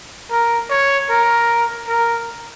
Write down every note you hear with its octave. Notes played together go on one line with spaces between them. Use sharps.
A#4
C#5
A#4
A#4